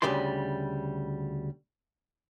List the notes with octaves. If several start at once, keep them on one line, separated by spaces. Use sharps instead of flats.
D2 C#3 G3 D5 C6